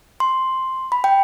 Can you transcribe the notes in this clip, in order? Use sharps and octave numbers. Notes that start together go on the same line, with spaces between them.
C6
B5
G5